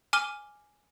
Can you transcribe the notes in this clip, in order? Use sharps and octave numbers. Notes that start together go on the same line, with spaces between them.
G#5 D6 F6 D#7 G7